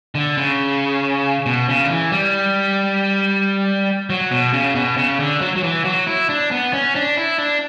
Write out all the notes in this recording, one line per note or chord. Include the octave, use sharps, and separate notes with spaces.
D3
C#3
B2
C#3
D3
E3
G3
F#3
B2
C#3
B2
C#3
D3
F#3
F#3
E3
F#3
E4
D4
B3
C#4
D4
E4
D4